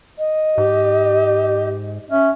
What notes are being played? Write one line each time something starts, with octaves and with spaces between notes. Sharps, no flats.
D#5
G#2 G4
C#4 E5